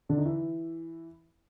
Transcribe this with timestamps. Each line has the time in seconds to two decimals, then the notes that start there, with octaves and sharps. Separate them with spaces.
0.09 D3 D4
0.18 D#4
0.25 E3 E4